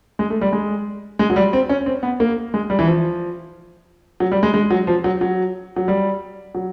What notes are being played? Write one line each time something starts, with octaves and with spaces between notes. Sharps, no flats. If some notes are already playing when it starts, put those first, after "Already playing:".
G#3
A3
G3
G#3
G#3
F#3
G3
C4
C#4
C4
B3
A#3
G#3
G3
E3
F3
F#3
G3
G#3
G#3
F#3
F3
F#3
F#3
F#3
G3
F#3